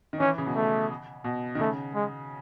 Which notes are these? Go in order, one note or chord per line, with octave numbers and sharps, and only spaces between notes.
D#3
E3 C#4
C#3
B2
A3
B2
D#3
C#3 A3
G#3